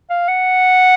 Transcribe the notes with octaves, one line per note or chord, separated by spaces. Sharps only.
F5
F#5